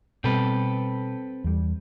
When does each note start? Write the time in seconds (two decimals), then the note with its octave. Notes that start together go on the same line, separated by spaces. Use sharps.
0.24 B2 G3 C4 A4 B4
1.44 E2 G3